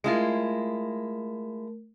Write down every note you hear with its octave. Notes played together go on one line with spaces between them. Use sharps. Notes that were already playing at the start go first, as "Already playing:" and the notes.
G#3 A3 E4 F4 A#4